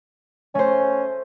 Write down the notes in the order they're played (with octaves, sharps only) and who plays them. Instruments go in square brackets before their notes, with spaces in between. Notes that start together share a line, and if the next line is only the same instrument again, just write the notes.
[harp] A3 C5 [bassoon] C#4